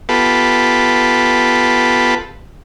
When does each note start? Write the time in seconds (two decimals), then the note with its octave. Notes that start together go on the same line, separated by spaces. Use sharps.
0.09 B3 F4 G4 A4 B4